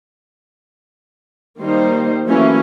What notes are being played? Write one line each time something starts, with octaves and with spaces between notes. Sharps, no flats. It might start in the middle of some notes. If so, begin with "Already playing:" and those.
D#3 G3 A#3 D#4 C5
E3 F#3 A3 A#3 C#4 E4